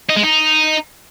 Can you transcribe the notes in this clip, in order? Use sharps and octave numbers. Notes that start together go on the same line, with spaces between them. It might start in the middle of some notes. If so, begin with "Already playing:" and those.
D#4
G#3
D#4